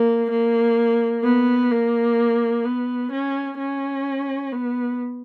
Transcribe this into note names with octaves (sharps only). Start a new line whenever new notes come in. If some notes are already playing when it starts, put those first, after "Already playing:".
Already playing: A#3
A#3
B3
A#3
B3
C#4
C#4
B3